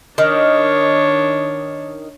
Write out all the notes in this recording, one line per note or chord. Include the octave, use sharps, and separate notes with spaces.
D#3 D4 C#5